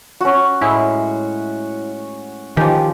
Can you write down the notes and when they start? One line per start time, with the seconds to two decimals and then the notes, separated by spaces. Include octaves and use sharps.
0.21 C#4 F#4
0.61 A2 G#3 E4
2.57 D#3 F3 C#4 G4